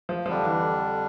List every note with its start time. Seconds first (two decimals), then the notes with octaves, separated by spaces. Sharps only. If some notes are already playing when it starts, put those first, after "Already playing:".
0.09 F3
0.26 F2 D3 F3 G3 D4
0.43 E3